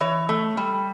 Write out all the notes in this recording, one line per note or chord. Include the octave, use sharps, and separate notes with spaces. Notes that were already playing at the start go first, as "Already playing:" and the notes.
E3 C#5
A3
G3